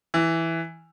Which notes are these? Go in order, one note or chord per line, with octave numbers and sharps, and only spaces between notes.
E3